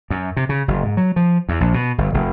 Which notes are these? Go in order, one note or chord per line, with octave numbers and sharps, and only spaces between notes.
F#2
C3
C#3
F#1
G#2
F#3
F3
E2
A#1
B2
G1
F1